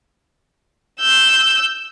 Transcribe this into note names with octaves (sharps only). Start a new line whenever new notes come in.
E6 G6